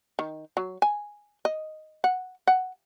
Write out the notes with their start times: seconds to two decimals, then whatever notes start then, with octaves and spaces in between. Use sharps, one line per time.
0.19 D#3
0.57 F#3
0.82 G#5
1.45 D#5
2.04 F#5
2.47 F#5